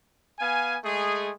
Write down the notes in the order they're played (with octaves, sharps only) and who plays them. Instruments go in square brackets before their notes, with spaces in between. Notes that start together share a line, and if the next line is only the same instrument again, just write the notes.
[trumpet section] B3 F5 G#5
G#3 A3 G#4